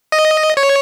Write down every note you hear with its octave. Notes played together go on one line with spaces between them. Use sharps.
D#5
C#5